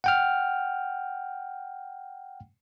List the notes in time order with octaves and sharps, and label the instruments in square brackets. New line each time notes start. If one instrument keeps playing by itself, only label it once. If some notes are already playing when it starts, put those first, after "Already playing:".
[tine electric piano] F#5 G5 F6